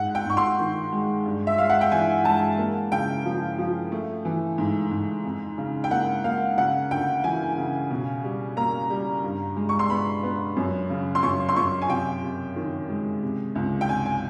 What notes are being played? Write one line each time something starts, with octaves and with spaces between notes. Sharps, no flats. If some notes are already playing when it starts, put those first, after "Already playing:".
Already playing: G#2 F#5
G5
G#2 C#6
C6
D#3
G#3
G2
E5
G#3 F5
F#5
G5
E3 G#5
G#3 A5
A#3
C#3 G5
F3
F3
A3
E3
G#2
G#2
F2
C#3
G5
A#3 F#5
A#3 F5
C#3 F#5
D2 G5
E3 G#5
C#3
B2
G3
A#3 A#5
G3
G2
G#3
C#6
C6
B3 B5
B3
F#2
C#3
C6
F#2 C#6
C6
F#2 C#6
G#5
C3 G5
C3
D#3
G#3
C3
C#2
G5
C3 G#5
G#5